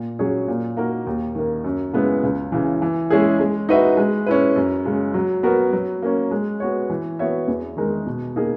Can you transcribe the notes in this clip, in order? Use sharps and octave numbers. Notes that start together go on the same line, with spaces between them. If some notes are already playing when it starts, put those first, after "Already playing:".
Already playing: A#2
F#3 C#4 G#4 C#5
A#2
A#3 D#4 F#4 A#4
D#2
D#3 A#3
F#2
C#3 G#3 B3 E4
C#2
C#3 E3
E3
G#3 C#4 E4 G#4
G#3
D#4 F#4 B4 E5
G#3
C#4 E4 B4
F#2
C#3 G#3
F#3
B3 F#4 A#4
F#3
A#3 C#4
G#3
B3 F#4 C#5
E3
B3 F#4 C#5 E5
E2
D#3 G#3 D#4 A#4
B2
A#3 D#4 G#4